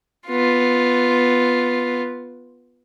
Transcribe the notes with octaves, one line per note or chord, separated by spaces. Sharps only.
B3 F4